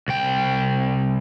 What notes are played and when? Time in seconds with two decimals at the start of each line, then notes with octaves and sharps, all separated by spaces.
0.08 C2 G5